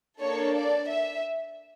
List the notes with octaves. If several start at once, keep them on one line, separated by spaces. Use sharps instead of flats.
A#3 D4 A4 C#5
D5
E5